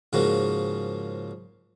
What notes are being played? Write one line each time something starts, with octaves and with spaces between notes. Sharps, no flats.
G#2 C#3 F3 A#3 F#4